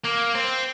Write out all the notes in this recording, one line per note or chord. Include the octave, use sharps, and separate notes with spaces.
A#3
C4